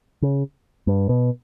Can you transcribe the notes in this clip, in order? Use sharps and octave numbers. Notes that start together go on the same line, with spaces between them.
C#3
G2
B2